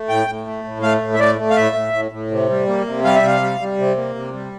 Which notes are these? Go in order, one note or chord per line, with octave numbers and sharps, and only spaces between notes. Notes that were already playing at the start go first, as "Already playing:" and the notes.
Already playing: A3
A2 G5
A2
A3
A2
A3 F5
A2
E5
A3 D5
A3
F5
A2 E5
A2
A2
A2
C3
G3
A#3
C3
G3 F5
E5
C3 F5
G3
G3
C3
A#3
C3
G3